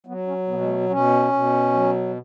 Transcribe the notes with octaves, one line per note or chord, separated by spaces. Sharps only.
F#3 B3
C#4
B2 B3
G#3
A3
B2 C#4
B2
F#3